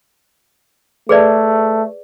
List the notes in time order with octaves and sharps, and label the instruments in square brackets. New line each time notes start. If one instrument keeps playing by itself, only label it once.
[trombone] A3 [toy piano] G#4 B4 D5